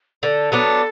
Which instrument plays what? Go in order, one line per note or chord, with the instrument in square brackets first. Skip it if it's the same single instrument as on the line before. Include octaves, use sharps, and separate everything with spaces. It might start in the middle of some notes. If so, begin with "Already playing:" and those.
[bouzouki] D3 [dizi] A4 B4
[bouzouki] F#3 B3 D4